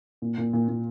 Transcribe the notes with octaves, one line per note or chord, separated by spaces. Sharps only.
A#2
A#2
A#2
A#2